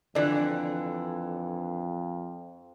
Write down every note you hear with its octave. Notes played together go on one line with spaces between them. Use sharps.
F2 D3 E3 D4